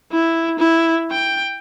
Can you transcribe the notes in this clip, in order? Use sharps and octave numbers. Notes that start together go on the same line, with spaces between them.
E4
E4
G5